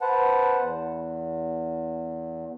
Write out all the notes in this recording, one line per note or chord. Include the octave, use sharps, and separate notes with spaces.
B4 C5 F#5 A5
E2